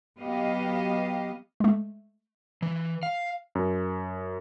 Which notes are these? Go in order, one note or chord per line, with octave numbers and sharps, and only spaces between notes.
F#3 B3 G4 D#5 F5
G#3 A3
E3
F5
F#2